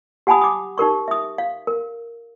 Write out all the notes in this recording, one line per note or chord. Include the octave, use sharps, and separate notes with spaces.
G4 F#5 G#5 A5 B5 D#6
D6 D#6
D#4 G4 A#4 C#6
E5 D#6
F5
A#4